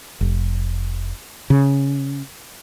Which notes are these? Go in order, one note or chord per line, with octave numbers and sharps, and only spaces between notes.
F1
C#3